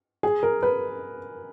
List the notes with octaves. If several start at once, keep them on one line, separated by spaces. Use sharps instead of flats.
G#4
A#4
B4